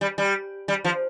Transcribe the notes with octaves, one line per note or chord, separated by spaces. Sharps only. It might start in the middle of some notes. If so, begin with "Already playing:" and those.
G3
G3
G3
F3